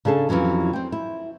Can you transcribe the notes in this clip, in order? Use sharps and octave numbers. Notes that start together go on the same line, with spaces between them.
C#3 D4 G#4 A4
F2 C3 E3 F#3 C#4
C4 G5
E4